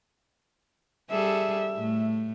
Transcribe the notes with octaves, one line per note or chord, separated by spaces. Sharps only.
G3 G#4 A4 E5
A2 A3